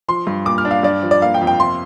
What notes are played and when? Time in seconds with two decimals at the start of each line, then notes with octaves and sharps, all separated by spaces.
0.08 F3 C6
0.27 G2
0.45 A#2 D6
0.58 F6
0.65 D4
0.71 F5
0.83 G2 D5
1.03 F3
1.11 D5
1.21 A#3 F5
1.34 G5
1.41 F2
1.47 G5
1.60 C3 C6